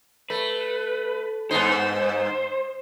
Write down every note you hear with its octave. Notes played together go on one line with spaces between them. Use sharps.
A3 B4
G2 B3 D#4 C5